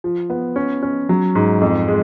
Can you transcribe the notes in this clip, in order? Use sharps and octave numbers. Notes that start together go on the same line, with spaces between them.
F3
B3
C#4
C#4
F#3
G#2
F2
G#3